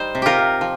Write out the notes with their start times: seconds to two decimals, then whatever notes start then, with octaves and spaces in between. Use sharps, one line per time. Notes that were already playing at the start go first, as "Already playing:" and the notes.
Already playing: G3 D#4 C5
0.15 C3
0.22 F4 G4 A#4
0.39 C3
0.61 F3